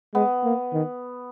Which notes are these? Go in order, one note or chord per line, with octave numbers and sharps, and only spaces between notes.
G#3 B3
A#3
D#3